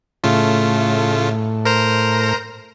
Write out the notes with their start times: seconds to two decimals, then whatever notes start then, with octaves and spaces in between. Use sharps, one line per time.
0.24 A2 C#3 A3 F4
1.65 A#4 C5 A#5